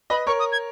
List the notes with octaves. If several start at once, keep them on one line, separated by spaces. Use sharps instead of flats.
B4 D#5 B5
A#4 C#5 C#6
D#6
G#6